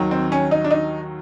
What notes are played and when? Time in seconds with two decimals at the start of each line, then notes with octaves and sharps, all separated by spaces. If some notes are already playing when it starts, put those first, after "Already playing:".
Already playing: D#2 D#3 F#3
0.11 C4
0.32 C#4
0.51 D#4
0.64 D4
0.70 D#4